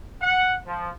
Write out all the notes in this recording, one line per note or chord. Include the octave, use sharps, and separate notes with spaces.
F#5
F3